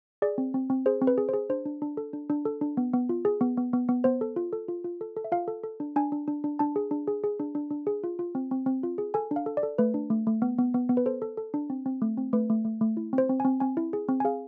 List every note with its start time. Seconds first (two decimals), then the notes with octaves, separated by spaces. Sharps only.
0.22 G#4 D5
0.38 C4
0.54 C4
0.70 C4
0.86 G#4 C5
1.01 C4
1.07 B4
1.18 G#4
1.29 C5
1.34 G#4
1.50 D4 C5
1.66 D4
1.82 D4
1.97 A4
2.13 D4
2.30 D4
2.45 A4
2.61 D4
2.77 B3
2.93 B3
3.09 F4
3.25 G#4
3.41 B3
3.57 B3
3.73 B3
3.89 B3
4.04 B3 C5
4.21 A4
4.36 F4
4.53 A4
4.68 F4
4.85 F4
5.01 A4
5.16 A4
5.24 E5
5.32 F4 F5
5.48 A4
5.64 A4
5.80 D4
5.96 D4 G#5
6.12 D4
6.28 D4
6.44 D4
6.59 D4 A5
6.76 G#4
6.91 D4
7.08 G#4
7.24 G#4
7.40 D4
7.55 D4
7.71 D4
7.87 G#4
8.04 F4
8.19 F4
8.35 C4
8.51 C4
8.66 C4
8.83 F4
8.98 G#4
9.14 A4 G#5
9.31 D4
9.36 F5
9.46 A4
9.57 D5
9.63 A4
9.78 A3 B4
9.94 D4
10.10 A3
10.27 A3
10.42 B3
10.58 B3
10.74 B3
10.90 B3
10.97 B4
11.06 A4 C5
11.22 A4
11.37 A4
11.54 D4
11.70 C4
11.86 C4
12.02 A3
12.17 C4
12.33 A3 B4
12.50 A3
12.65 A3
12.81 A3
12.97 E4
13.13 C4
13.18 C5
13.29 C4
13.40 C4 G#5
13.60 C4 G#5
13.77 E4
13.93 G#4
14.09 C4
14.20 G#5
14.25 G#4 F5